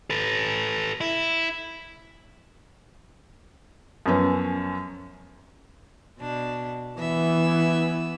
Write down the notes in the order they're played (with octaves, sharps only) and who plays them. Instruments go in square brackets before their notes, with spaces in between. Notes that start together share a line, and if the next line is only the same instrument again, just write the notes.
[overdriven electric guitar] A4 B4
E4
[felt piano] F#2 F3 B3 C#4
[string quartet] B2 D4
[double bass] E3 [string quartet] B3 E5